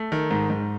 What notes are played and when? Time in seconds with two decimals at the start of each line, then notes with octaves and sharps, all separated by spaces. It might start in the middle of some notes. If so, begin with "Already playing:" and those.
Already playing: A3
0.12 D#3
0.31 G#2
0.50 G#2